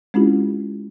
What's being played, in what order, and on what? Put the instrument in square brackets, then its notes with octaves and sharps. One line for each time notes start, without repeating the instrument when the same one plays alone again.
[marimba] G#3 C4 C#4 E4 F4 G4